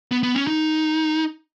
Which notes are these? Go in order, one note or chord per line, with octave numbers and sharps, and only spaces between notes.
B3
B3
C#4
D#4